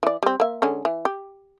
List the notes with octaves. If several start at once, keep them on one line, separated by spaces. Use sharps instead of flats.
E3 D5
G3 C4
A#3 E5
D3 G#3 C#4
E3
G4